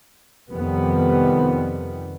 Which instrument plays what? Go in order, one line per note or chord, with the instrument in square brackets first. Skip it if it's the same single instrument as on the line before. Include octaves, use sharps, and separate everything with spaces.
[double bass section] F2 C3 D#3 G3 B3